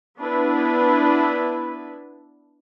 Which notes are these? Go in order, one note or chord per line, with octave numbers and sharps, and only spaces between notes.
B3 D4 E4 B4